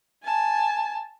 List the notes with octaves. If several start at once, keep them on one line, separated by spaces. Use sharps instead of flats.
G#5 A5